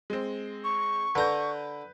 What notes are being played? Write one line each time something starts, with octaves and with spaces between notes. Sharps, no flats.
G#3 C4
C#6
D3 B4 A#5 G6